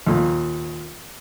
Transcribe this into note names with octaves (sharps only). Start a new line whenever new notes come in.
D#2 A#2